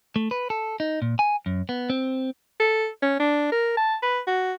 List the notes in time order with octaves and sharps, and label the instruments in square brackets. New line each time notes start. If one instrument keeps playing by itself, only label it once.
[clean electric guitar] A3
B4
A4
D#4
A#2
G#5
F#2
B3
C4
[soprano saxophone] A4
C#4
D4
A#4
A5
B4
F#4